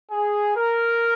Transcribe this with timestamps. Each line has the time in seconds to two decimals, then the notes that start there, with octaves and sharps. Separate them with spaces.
0.11 G#4
0.56 A#4